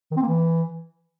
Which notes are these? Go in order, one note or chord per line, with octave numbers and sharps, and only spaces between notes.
D#3
C4
A#3
E3